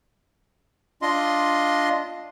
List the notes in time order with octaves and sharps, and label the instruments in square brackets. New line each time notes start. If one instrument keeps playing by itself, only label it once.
[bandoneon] D4 F4 D#5 C6